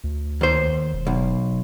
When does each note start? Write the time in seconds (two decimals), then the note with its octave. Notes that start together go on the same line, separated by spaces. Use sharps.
0.04 D2
0.41 D#2 C5
0.93 E1
1.07 B1